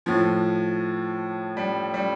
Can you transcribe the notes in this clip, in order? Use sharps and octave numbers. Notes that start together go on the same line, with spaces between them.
A2 F3
G3
G3